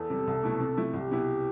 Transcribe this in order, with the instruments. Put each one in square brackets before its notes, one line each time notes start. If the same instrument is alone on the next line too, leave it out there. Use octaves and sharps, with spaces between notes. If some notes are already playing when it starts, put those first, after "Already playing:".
Already playing: [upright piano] E2 [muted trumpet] A4
[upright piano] C3 G3
C2
B2 A3 E4
C3
F3 A3 E4
[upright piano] C2 [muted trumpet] G4
[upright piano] B2 B3 E4